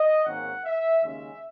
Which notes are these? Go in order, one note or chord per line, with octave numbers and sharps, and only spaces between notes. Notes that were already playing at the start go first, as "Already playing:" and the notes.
Already playing: D#5
G#1 G#2 D#3 A#3 C#4 F#5
E5
D#2 C#3 G#3 C#4 E5